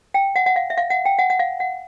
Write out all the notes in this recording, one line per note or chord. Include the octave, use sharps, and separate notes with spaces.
G5
F#5
F#5
F5
E5
F5
F#5
G5
F#5
F#5
F5
F#5